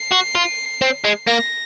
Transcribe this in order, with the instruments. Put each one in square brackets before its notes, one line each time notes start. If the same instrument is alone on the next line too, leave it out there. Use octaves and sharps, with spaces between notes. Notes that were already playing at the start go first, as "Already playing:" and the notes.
Already playing: [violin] C7
[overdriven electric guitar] F#4
F4
C4
G#3
[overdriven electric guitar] A#3 [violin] A#6